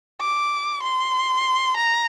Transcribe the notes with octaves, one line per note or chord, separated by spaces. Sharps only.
D6
C6
A#5